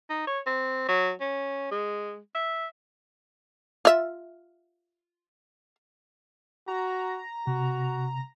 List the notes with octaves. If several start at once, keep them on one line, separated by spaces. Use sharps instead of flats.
D#4
C#5
C4
F#3
C#4
G#3
E5
F4 E5
F#4 A#5
C3 F#4